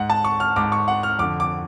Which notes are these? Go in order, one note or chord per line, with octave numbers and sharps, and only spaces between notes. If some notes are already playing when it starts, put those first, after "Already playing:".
Already playing: G#2 F#5
A5
C#6
F6
G#2 D6
C#6
F#5
F6
F2 D3 D6
D6